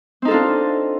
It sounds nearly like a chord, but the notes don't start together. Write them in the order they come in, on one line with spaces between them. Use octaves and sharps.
C4 D#4 A4 F4 D4